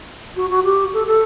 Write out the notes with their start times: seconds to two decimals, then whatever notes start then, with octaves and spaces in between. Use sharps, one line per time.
0.36 F#4
0.50 F#4
0.64 G4
0.93 A4
1.07 A4